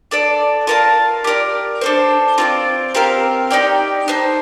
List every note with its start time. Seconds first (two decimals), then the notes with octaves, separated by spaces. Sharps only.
0.11 D4 A4 D5
0.67 F4 A#4 F5 A5
1.24 G4 A#4 D5
1.81 D4 A4 C5
2.38 C4 F4 A4 D5
2.95 C4 G4 A#4 F5
3.51 D#4 G4 D5 G5
4.08 D#4 A4 C5